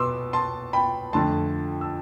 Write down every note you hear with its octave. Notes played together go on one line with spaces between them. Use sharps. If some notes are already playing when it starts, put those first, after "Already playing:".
Already playing: B2 B3 C6 D6 E6
A5 C6
G5 B5
F2 D3 A3 A5 C6
E6